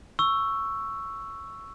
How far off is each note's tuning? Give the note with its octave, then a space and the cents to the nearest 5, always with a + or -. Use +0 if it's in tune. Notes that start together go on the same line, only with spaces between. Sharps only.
C#6 +0 E6 +10